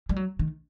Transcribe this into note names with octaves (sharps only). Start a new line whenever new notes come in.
G3
F#3
D#3